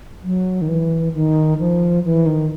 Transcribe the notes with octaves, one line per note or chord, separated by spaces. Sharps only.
F#3
D#3
E3
D#3
F3
E3
D#3